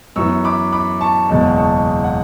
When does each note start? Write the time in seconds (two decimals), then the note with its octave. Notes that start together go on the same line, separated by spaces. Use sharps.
0.16 F#2 E3 B3 C#6 E6
0.44 B5 D6
0.72 B5 D6
1.01 A5 C#6
1.29 F#1 E2 B2 G#3 A5 C#6
1.58 A5 C#6
2.04 F#5